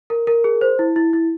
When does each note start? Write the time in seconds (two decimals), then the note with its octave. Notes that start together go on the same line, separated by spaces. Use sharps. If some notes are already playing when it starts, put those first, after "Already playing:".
0.10 A#4
0.27 A#4
0.44 G#4
0.61 C5
0.79 E4
0.96 E4
1.13 E4